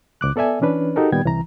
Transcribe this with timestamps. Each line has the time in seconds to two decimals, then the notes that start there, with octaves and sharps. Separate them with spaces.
0.21 C#2 D6 F#6
0.36 B3 A4 D5 E5 G#5
0.61 E3 C#4 D4 B4
0.96 D#4 F#4 G4 A4 A#4
1.12 A#2 D#3 G3 B3 G5 G#6
1.25 C2 E3 A#5